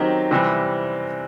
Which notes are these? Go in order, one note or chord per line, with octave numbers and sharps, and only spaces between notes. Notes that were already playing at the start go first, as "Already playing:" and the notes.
Already playing: D#3 F#3 C4 D#4 G4
C3 E3 G3 C4